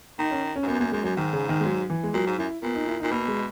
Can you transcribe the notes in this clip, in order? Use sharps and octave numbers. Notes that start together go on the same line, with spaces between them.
D#3 D#4
C#4
C#4
G#2
F#2 B3
F#2 A#3
F#2 G#3
F#2 F#3
G#2 D#3
C#3
D#3
G#3
F#3
E3
G#3
A#2 F#3
G#2
F#2 E4
A#2 B3
D#4
E4
A#2 D#4
B2 A#3
G#3